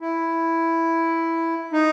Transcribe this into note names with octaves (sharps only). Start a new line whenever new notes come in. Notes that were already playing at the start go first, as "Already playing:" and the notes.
E4
D#4